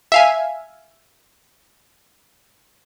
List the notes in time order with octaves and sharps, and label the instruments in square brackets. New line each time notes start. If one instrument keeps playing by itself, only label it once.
[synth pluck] E5 F5 G#5